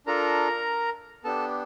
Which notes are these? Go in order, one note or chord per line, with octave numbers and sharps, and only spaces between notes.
D4 F4 A4 A#4 A#5
B3 D4 G4 A4 A5